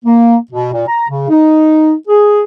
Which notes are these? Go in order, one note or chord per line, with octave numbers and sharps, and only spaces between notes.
A#3
B2
A#2
A#5
C#3
D#4
G#4